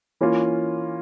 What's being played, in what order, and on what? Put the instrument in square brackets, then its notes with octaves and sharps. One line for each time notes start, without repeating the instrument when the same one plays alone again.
[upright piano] E3 A#3 C#4 F4